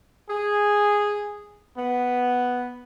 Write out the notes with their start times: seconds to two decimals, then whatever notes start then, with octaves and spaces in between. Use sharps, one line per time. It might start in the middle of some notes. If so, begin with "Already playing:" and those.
0.30 G#4
1.77 B3